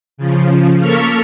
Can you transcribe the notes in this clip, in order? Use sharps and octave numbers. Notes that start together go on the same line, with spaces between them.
C#3 F3
A#3 A4 A#4 C#6 F6 B6